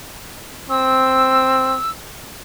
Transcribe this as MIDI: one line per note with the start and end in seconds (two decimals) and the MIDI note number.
0.70 1.78 60
0.70 1.90 88